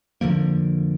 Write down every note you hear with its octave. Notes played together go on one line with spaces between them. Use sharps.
F2 D3 F3 A#3